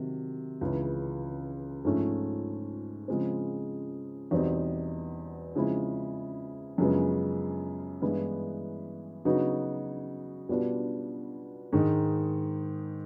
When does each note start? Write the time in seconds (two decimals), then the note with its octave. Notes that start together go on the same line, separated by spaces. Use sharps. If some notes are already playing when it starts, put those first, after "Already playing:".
Already playing: C3 D#3 F#3
0.61 C#2 C#3 E3
1.85 G#2 F3 A3 C#4
3.08 C#3 F3 G#3 C4
4.31 E2 B2 G3 C4 D#4
5.55 C#3 F3 G#3 C4 E4
6.78 F#2 C#3 F3 G#3 B3
8.02 G2 E3 G#3 B3 E4
9.25 C#3 F#3 B3 D#4 F#4
10.49 B2 G3 B3 D4 F4
11.73 G#2 D#3 G#3